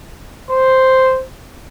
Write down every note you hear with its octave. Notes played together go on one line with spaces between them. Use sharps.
C5